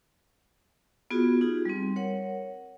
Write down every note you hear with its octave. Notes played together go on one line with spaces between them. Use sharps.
B3 F4 F#4 G#4
D#4 F4 G4 G#4
G3 C4
A#4 C#5 F#5